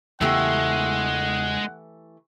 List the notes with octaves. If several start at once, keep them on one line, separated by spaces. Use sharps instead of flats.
E2 C#3 E3 G#3 A3 B3 G4 F#5